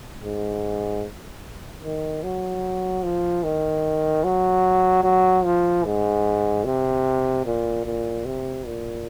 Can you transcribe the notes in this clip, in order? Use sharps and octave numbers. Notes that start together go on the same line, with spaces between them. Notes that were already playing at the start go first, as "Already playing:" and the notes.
G#2
D#3
F#3
F3
D#3
F#3
F#3
F3
G#2
C3
A#2
A#2
C3
A#2